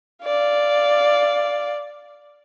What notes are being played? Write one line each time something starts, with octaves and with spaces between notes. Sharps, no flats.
D5 F5